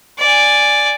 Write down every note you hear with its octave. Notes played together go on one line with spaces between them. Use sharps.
D5 G#5